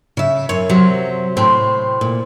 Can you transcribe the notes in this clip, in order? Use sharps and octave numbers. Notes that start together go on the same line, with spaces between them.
C#3 E5
F#2 C#5
C3 F#3
A2 C4
A#2